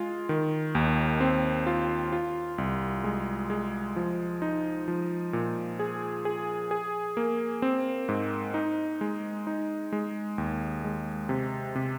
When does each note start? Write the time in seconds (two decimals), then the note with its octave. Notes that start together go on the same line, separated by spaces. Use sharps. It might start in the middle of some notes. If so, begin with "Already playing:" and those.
Already playing: G#3 F4
0.29 D#3
0.75 D#2
1.21 C4
1.67 F4
2.12 F4
2.58 C2
3.04 G#3
3.50 G#3
3.96 F3
4.42 D#4
4.88 F3
5.33 A#2
5.79 G#4
6.25 G#4
6.71 G#4
7.17 A#3
7.62 C4
8.09 G#2
8.54 D#4
9.01 G#3
9.47 D#4
9.92 G#3
10.38 D#2
10.84 G#3
11.29 C3
11.75 C3